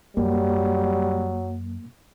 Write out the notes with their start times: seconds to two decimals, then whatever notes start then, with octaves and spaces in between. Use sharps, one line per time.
0.17 F#2 F#3 G3 A#3